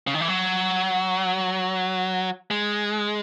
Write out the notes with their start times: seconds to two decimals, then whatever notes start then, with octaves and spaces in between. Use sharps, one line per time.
0.07 C#3
0.14 D#3
0.21 E3
0.28 F#3
2.51 G#3